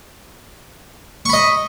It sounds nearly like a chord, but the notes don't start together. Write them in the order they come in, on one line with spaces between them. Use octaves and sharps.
C#6 B5 D#5